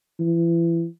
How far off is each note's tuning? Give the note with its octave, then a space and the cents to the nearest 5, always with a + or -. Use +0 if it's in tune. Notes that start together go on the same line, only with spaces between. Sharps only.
E3 +30